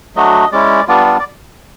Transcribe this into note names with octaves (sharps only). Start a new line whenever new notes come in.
F#3 A3 D4 F#4 D#5
G#3 C#4 E4 D5
G3 B3 D4 F4 D5
D5
D5